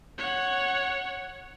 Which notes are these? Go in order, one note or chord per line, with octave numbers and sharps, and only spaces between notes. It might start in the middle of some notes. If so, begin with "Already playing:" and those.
C#5 F#5